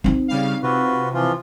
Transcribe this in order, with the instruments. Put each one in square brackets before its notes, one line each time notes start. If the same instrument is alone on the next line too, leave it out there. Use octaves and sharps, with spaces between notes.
[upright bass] C4 D#4
[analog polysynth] C#3 G3 F5
[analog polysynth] C3 [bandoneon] F4 F#4 B4
[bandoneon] E3 F3 F4